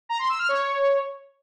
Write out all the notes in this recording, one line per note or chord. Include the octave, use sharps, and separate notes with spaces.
A#5
C6
E6
F6
C#5